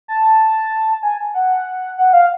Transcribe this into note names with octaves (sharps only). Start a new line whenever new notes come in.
A5
G#5
F#5
F#5
F5